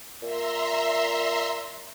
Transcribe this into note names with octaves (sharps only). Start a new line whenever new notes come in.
A#2 E5 A#5 C6